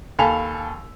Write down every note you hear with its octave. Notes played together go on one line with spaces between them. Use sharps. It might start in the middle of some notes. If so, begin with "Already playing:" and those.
D#2 A4 F5 G#5 B5 F7